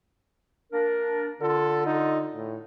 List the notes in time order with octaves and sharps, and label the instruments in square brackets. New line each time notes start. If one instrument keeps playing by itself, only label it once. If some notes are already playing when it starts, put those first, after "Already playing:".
[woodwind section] A#3 D4 A#4
[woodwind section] D3 F4 [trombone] A4
[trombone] D#4
A2